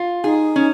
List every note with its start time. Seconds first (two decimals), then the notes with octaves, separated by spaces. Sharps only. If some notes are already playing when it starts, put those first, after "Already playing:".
Already playing: F4
0.24 D#4 G#4
0.56 C#4